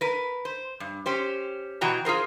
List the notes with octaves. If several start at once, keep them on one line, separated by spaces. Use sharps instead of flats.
A#4 B4
C5
G2
C#4 G4 C5
B2 E3 F#4 G5 A#5
F4 G#4 A#4 C5